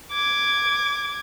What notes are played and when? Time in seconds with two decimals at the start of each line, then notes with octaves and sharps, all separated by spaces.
0.12 D6 G#6